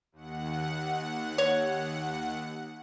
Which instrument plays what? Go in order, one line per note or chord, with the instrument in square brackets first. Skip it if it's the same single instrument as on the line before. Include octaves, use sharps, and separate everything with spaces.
[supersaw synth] D#2 F#5
[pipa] C#5